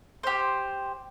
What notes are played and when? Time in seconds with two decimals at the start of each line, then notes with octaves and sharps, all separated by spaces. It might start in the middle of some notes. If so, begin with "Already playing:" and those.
0.23 G4 C5